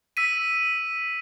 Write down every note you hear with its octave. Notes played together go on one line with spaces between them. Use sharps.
E6 B6 D#7